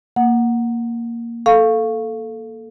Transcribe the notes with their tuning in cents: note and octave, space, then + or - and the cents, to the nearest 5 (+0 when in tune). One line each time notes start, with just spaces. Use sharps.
A#3 +0 F#5 -5
A4 +0 F5 +0 C#6 -5